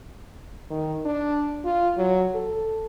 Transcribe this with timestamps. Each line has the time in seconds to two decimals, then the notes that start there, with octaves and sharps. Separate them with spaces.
0.70 D#3
1.05 D4
1.65 F4
1.97 F#3
2.34 A4